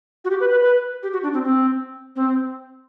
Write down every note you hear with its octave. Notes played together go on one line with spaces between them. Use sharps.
F#4
G4
B4
B4
B4
G4
F#4
D4
C4
C4
C4